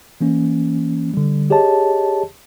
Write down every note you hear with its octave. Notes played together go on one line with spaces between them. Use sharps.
E3 A#3 C#4
D3 G3
G4 G#4 C#5 D#5 A5